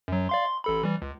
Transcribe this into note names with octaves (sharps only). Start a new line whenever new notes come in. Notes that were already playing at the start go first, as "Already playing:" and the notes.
F#2 F#3
D5 F5 C6
C6
A1 A4 B5
E3 G3
C#2